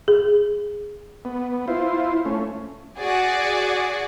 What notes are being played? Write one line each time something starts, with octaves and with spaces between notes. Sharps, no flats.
G#4
B3
E4 F4 C5
A3 C#4
F#4 G#4 D5